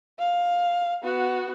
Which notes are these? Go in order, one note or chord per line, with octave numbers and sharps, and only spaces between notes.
F5
B3 F#4